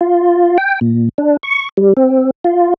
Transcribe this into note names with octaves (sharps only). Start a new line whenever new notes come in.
F4
G5
A#2
D4
C#6
G3
C4
F4